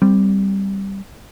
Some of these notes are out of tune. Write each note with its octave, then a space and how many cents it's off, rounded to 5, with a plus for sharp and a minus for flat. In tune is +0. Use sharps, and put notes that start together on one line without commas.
G3 +0 C4 -10